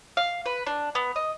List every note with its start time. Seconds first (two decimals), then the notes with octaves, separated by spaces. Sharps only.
0.17 F5
0.46 B4
0.67 D4
0.95 B3
1.16 D#5